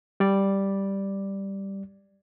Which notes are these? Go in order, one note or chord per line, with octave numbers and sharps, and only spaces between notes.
G3 D5